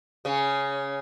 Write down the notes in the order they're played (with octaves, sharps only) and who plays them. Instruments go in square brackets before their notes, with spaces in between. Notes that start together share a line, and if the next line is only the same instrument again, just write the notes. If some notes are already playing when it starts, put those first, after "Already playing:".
[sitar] C#3 C#4